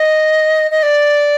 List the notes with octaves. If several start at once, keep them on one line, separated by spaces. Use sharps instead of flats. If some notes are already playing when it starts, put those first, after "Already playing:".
Already playing: D#5
D#5
D5